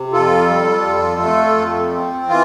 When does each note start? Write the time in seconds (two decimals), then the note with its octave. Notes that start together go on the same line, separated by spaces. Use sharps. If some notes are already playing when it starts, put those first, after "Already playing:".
Already playing: C3
0.13 F2 F4 A4
0.49 G3
0.85 F2
1.21 A3
1.56 F2
1.92 C4
2.29 E3 F4